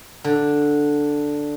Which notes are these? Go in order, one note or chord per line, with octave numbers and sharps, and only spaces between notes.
D3